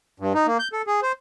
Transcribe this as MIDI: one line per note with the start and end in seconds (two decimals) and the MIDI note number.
0.20 0.33 43
0.35 0.47 63
0.47 0.57 58
0.59 0.68 91
0.73 0.82 69
0.87 1.00 68
1.02 1.12 72